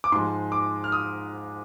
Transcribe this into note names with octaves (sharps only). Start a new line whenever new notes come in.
D6
G#2 F3 G#3 C6
D6
F6
D#6